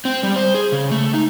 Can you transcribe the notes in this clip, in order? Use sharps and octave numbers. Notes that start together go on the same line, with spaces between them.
C4
G3
C5
G#4
C#3
A3
D#4